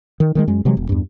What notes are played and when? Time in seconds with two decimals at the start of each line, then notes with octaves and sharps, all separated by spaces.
0.20 D#3
0.35 D#3 G3 G#3
0.47 F#2 G#3
0.65 C3 E3 F#3 G#3
0.77 E1
0.89 E2 G2